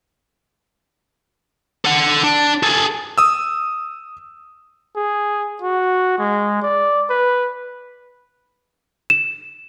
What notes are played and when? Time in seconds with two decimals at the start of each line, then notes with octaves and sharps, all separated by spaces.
1.85 A4 F#5
2.24 D4
2.63 G#4 A4
3.18 D#6 E6
4.96 G#4
5.62 F#4
6.18 G#3
6.62 D5
7.09 B4
9.10 E7